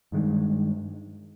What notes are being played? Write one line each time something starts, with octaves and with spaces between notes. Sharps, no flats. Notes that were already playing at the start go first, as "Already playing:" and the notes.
G2 D#3 G#3